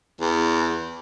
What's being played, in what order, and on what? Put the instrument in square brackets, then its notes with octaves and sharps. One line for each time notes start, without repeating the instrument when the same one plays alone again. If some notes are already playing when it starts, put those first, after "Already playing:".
[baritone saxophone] E2